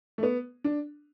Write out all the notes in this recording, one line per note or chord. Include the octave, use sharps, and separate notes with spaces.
A3
B3
D4